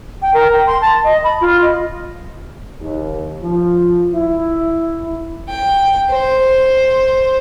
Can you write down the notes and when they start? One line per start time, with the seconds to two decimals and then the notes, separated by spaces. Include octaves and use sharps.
0.22 G5
0.34 A#4
0.53 G5
0.67 C6
0.81 A5
1.04 D#5
1.24 B5
1.41 F4
1.62 D#5
2.80 D#2
3.43 F3
4.13 E4
5.49 G5
6.10 C5